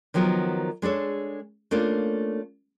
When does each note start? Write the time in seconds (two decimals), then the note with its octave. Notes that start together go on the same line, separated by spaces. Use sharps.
0.14 D#3 F3 F#3 B3 A#4
0.82 G#3 D4 A4 C#5
1.71 A3 A#3 C#4 D4 F4